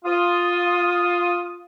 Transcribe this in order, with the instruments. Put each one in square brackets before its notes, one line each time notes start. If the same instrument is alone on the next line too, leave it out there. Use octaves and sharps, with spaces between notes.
[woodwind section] F4 D#6